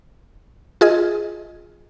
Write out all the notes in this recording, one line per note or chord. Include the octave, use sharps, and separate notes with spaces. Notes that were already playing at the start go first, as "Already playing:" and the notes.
F4 G#4 D#5